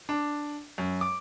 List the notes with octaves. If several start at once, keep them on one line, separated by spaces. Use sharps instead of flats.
D4
F#2
D6